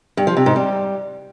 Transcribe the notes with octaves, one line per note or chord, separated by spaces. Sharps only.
G2
F3
C3
G#2
G3